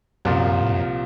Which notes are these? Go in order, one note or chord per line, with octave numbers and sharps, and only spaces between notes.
C2 F#2 A#2 F3
A2
F#2